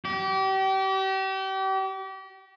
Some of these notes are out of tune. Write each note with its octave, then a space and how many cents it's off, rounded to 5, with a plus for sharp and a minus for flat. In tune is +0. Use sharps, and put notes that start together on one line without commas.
G4 -35